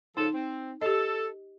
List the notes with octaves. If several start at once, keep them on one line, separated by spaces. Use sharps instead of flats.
C#3 F3 D#4 A4
C4
G4 A4 D#5